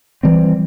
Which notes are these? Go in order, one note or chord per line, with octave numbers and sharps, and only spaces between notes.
E3 G3 C4